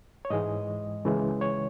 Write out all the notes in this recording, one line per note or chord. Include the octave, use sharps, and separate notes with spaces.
C#5
G#2 E3 G#3 D#5
C#2 C#3 E3 G#3
C#5